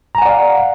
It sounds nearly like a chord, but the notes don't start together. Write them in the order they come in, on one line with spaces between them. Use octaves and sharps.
A#5 G#5 F#5 D5 F5